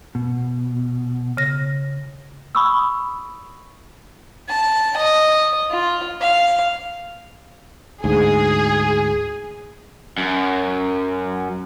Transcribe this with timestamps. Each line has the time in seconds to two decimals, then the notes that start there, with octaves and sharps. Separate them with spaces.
0.15 B2
1.37 C#3 A#6
2.55 B5 C#6 D#6 E6
4.49 A5
4.96 D#5
5.70 F4
6.21 F5
8.04 D2 G#2 G#4
10.18 F#2